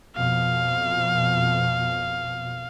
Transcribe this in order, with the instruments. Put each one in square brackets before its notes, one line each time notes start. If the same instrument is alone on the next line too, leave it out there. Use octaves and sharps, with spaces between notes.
[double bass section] F2 B2 [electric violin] F5